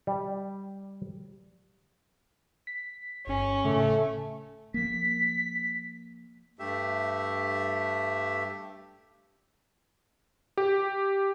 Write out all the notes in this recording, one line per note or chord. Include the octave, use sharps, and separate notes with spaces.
G3
B6
G1 C#4
A2 C#3 A3
F3 A#3 B6
G2 A3 G4 E5
G4